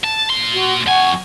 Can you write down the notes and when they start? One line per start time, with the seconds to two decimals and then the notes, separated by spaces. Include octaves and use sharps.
0.04 A5
0.30 A#2 C6
0.55 F#4
0.86 F2 F#5 G#5 C#6